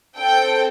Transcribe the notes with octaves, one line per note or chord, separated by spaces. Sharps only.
C4 A4 G5